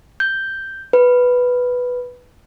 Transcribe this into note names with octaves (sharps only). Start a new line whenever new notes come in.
G6
B4